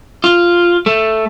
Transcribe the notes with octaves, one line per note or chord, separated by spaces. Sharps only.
F4
A3